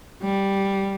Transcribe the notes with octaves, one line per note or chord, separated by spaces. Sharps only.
G3